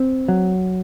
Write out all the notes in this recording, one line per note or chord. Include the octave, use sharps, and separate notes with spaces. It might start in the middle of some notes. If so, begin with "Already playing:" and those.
Already playing: C4
F#3